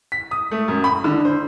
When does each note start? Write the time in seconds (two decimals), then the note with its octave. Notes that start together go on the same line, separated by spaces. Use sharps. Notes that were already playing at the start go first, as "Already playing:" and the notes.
0.12 B6
0.31 D#6
0.51 A3
0.68 F#2
0.84 B5
1.04 D3
1.25 C5